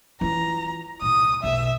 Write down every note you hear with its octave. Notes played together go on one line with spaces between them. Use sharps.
E3 F4 A#5
C2 A#2 D#6
F1 B1 E5